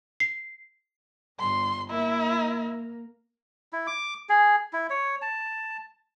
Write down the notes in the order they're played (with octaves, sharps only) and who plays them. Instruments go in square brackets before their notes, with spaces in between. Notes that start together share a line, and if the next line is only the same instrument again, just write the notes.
[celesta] C7
[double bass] G1 [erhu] C6
[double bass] A#3 [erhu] E4
[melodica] E4
D6
G#4
E4
C#5
A5